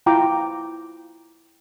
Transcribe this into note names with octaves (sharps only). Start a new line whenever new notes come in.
E4 F4 G5 A#5 D6